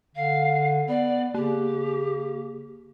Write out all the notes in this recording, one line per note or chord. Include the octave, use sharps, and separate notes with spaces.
D3 F5
B3 D5
C#3 A#3 G4